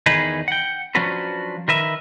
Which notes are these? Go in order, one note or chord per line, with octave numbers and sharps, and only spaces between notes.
E2 D#3 D#4 G#4 B4 D#5
F#5 G5
F3 F#3 C#4 D4 F#4 B4
D#3 A#4 B4 E5